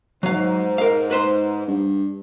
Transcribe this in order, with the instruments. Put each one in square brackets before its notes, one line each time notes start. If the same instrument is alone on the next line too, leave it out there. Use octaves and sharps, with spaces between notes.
[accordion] G#2 [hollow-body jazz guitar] F#3 F5
[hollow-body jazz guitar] A#4 F5
B4 C5 C6
[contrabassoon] G2